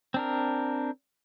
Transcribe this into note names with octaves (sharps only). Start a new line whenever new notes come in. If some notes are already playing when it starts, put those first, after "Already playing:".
C4 D4 A#4